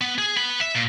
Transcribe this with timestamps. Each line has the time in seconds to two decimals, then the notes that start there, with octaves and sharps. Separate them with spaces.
0.01 B3
0.18 G#4
0.36 B3 B5
0.61 E5
0.75 A#2